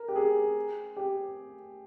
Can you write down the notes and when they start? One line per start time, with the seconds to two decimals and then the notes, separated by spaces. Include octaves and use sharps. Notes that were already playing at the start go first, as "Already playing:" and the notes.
Already playing: A#4
0.08 G4
0.16 G#4
0.96 G4